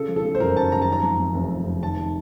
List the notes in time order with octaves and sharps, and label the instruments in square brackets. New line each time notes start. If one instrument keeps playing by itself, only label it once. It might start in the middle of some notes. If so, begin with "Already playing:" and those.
Already playing: [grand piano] C#3 A4
F3
A4
C#3
C5
F#1 A#4
F#1 A5
F#1 A#5
A5
D#3 A#5
F2
F2
F1
F1
F1
D#3 A5
D#3